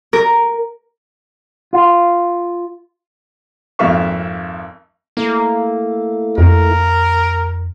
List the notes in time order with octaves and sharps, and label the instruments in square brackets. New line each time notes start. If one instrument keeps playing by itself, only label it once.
[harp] A#4
[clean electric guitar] F4
[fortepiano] G#1 F2 A#3 E5 F5 C#6
[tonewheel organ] A3 E4 [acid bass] A#3
[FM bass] F2 [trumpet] A#4